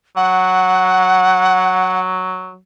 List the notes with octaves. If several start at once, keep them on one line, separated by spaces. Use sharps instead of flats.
F#3 F#5